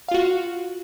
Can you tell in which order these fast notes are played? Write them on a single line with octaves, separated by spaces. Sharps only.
F5 F4 F#4